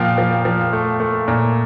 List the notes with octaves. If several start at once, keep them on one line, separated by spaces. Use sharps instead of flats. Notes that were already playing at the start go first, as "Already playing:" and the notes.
Already playing: A#2 F3 F5 G5
F3
F3
A3
A3
A#2